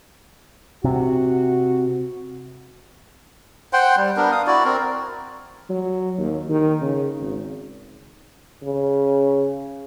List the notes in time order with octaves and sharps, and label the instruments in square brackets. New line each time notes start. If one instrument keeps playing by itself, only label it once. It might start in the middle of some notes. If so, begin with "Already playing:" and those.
[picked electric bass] C3 [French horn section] F#4
[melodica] C5 F#5 G5 C6
G3
B3 D4 A#4
F5 D#6
E4 F#4 D5
C4 A#4
[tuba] F#3
D#2
D#3
C#3
G#1
[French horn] C#3